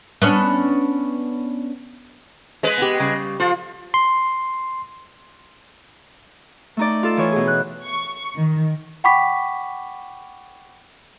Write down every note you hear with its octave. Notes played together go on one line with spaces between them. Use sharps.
B3 C#4 D4
G#3 B4
B3 F4 G4
C#3 G3
F3 F4 A4 C5
C6
A3 D#4 D5
F4 A4
E3 C#5
B2 G#4
F#6
C#6
D#3
F#5 G5 B5 C#6 D6 B6